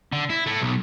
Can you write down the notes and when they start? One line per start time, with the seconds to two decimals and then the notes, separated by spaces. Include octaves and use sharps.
0.13 D3
0.30 E4
0.47 A3 E4
0.61 B1